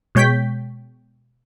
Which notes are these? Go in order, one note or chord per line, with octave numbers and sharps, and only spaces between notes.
B2 G#3 C#5 G5 G6 B6